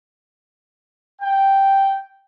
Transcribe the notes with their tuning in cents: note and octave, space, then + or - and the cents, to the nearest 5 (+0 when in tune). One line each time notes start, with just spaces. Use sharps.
G5 -5